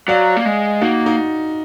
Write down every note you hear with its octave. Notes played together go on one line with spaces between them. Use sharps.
F#3 D5 F5
A#3
G#3
A#3 D#4 F#4
D#4